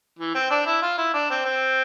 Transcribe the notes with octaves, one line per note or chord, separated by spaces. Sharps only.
E3
C4
D4
E4
F4
E4
D4
C4
C4